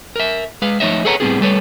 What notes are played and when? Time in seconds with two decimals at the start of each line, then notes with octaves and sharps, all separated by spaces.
0.16 A#4 E5
0.62 G#3 B4 F5
0.80 F3 A3 D#4 C#5 D#5 E5
1.05 G#4 A4 B4 C#5 F#5 A#5
1.20 A2 G3 B3 C4 F4 G#4
1.41 G3 A3 A4 B4 C#5